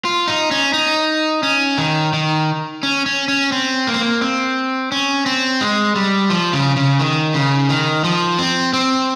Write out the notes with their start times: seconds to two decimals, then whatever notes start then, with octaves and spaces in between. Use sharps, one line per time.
0.05 F4
0.28 D#4
0.51 C#4
0.73 D#4
1.43 C#4
1.78 D#3
2.13 D#3
2.83 C#4
3.06 C#4
3.28 C#4
3.52 C4
3.87 A#3
3.94 C4
4.01 A#3
4.21 C4
4.92 C#4
5.26 C4
5.61 G#3
5.96 G3
6.30 F3
6.53 C#3
6.76 C#3
6.99 D#3
7.34 C#3
7.69 D#3
8.04 F3
8.39 C4
8.73 C4